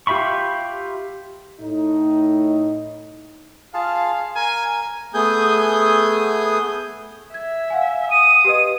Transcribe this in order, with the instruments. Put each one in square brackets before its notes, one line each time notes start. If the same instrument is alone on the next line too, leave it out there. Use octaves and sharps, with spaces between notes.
[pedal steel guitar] F4 G4 E5 B5 C#6
[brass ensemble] A2 D#4
[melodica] F4 G#4 A5 [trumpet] F5
[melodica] A#4 [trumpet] G#5
[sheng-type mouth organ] A3 B3 G#4 G#5 D#6 G6
[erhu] E5 [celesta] G#6
[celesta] F5 F#5 G#5
[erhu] D#6 [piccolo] D#7
[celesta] G4 B4 D#5